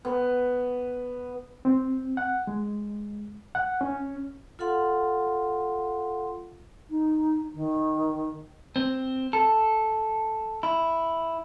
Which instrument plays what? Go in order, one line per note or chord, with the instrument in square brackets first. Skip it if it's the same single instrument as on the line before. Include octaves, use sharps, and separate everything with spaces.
[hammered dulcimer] B3
[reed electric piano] C4
F#5
G#3
F#5
C#4
[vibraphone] F4 A4 F5 F#5 C6
[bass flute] D#4
D#3
[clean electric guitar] C4
A4
E4